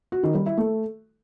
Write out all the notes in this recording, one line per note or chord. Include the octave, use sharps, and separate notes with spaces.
F#4
D#3
G3
E4
A3